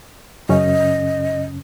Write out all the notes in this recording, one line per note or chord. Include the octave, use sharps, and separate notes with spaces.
F#2 C#3 C#4 D#5